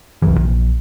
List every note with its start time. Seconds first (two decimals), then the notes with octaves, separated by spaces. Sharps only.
0.22 D1 C2 F#2 E3
0.38 A#1